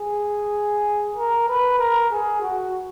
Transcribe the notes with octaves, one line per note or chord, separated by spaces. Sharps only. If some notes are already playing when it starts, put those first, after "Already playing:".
Already playing: G#4
A#4
B4
A#4
G#4
F#4